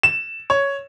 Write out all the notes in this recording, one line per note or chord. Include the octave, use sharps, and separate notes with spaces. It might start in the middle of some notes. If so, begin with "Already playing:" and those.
E7
C#5